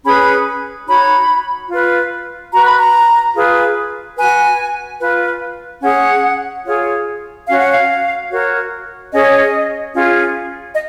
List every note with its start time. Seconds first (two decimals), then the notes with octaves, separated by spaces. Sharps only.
0.04 C#4 G#4 B4 B5
0.87 D#4 F#4 C#5 B5
1.69 F4 B4
2.52 F#4 B4 A#5
2.65 B5
2.77 A#5
3.35 F4 G#4 B4
4.17 F#4 B4 G#5
4.99 F4 B4
5.82 C#4 G#4 C#5 F#5
6.65 F4 G#4 C#5
7.47 C#4 F#4 C#5 F5
7.59 F#5
7.70 F5
8.30 F#4 A#4 C#5
9.12 C#4 G#4 C#5 D#5
9.94 C#4 F4 G#4
10.72 D#5